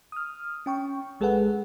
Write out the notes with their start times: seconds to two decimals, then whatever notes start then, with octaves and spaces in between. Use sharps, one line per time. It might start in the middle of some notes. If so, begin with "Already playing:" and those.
0.12 D#6 F6
0.66 C#4 G5 C#6
1.20 A1 G#3 G#4 A4 B4 F#5